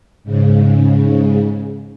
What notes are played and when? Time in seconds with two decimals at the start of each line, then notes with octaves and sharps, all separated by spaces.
0.24 G#2 C#3